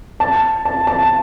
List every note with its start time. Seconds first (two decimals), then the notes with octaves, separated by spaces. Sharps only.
0.20 A5
0.65 A5
0.87 A5